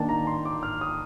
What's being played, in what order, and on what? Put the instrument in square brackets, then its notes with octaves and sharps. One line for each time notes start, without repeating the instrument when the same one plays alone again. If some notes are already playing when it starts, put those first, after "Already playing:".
Already playing: [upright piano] D#3 A#3 D4 [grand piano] G5 A5
[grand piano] A#5
C6
D6
F6
D#6